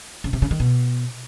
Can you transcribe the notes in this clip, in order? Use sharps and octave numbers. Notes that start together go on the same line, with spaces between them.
C#3
C3
C#3
D#3
B2